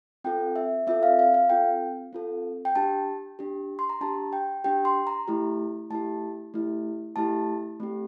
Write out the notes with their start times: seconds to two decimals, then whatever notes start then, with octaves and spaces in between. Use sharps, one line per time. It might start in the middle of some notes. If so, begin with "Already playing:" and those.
0.24 C4 F4 A4 G5
0.56 E5
0.87 C4 F4 A4 E5
1.03 F5
1.19 F5
1.34 F5
1.50 C4 F4 A4 G5
2.13 C4 F4 A4
2.65 G5
2.76 D4 G4 A5
3.39 D4 G4
3.79 C6
3.89 A#5
4.01 D4 G4 A5
4.33 G5
4.64 D4 G4 G5
4.85 C6
5.07 A#5
5.28 A3 E4 G4
5.90 A3 E4 G4 A5
6.54 A3 E4 G4
7.16 A3 E4 G4 A5
7.80 A3 C4 G4